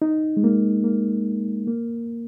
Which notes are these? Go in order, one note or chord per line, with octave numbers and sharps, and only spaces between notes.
D#4
G#3
A#3
A#3
A#3